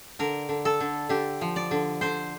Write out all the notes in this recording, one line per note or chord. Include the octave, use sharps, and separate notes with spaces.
D3 A#4
D3
A4
D3
D3 G4
F3
D5
D3
D3 C5